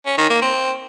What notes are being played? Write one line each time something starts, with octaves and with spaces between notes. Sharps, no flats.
C#4
D#3
A#3
C4